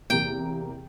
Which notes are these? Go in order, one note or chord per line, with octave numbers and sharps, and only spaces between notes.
E2 C3 A#3 G5